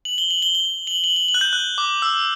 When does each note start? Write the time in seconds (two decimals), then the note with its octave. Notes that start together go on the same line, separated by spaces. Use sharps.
0.05 F#7
0.18 G7
0.31 F#7
0.42 G7
0.55 G7
0.87 F#7
1.04 F#7
1.16 F#7
1.28 F#7
1.34 F#6
1.41 G6
1.53 F#6
1.78 D6
2.02 E6